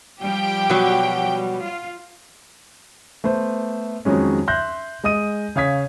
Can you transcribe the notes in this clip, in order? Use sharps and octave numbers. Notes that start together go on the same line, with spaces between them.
F3 G3 G4 G5
B2 F#3
F4
A3 B3 C5
F2 D#3 F#3 G#3 C#4
E5 C6 F#6 G6 A#6
G#3 D#5 D#6 D#7
C#3 C#5 F5 D#6 G#6 B6